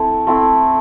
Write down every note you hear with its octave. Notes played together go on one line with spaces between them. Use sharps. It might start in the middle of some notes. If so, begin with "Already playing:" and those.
Already playing: A3 C4 E4
A3 C4 E4